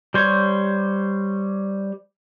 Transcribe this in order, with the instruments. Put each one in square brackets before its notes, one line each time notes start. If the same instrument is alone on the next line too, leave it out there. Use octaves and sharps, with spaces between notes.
[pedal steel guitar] G3 C5 C#5